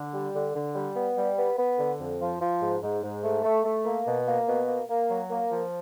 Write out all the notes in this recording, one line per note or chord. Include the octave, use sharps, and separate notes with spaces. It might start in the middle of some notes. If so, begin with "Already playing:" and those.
Already playing: D3
G3
D3
D3
G3
B3
G3
B3
B3
D3
F2
F3
F3
G#2
G#2
G#2
A3
A3
A3
A#3
B2
A#3
B2
A#3
A#3
F#3
A#3
F3